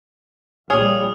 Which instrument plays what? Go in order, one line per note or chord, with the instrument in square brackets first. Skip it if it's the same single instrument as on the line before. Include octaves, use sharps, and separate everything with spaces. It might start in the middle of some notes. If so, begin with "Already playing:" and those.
[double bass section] A#1 G3 [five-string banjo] G#4 [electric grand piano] C#5 [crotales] D#6 F6 F7